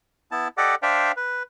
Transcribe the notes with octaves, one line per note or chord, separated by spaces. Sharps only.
B3 E4 A5
G4 A4 D5 D#5 F#5 D6
D4 C5 D5 E5 F5 G5
B4